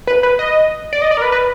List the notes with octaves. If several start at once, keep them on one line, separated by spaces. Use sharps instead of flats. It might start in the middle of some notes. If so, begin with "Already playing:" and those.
B4
B4
D#5
D5
D#5
D5
A#4
B4
B4